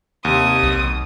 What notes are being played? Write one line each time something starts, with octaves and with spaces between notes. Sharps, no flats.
D#2 C3 D#6
B1